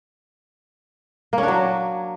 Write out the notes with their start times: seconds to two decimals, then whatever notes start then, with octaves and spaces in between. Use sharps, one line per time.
1.33 A#3
1.38 C#4
1.43 D4
1.48 F#3